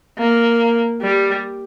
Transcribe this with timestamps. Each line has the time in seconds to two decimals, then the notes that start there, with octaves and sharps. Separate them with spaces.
0.18 A#3
1.03 G3